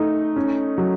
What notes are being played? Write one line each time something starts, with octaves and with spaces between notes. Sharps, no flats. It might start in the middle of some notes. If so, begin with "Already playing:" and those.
Already playing: A3 D#4
C#4
F#3